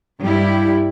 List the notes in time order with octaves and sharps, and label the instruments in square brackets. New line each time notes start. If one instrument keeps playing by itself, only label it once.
[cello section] G2 G3 E4 G4